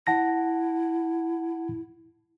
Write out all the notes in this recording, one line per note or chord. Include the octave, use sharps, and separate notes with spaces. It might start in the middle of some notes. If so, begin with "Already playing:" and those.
E4 F#5 A5 A#6